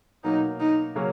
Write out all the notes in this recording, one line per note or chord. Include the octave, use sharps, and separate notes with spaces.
B2 F#3 A#3 D#4
D#4
C#3 F#3 A#3 C#4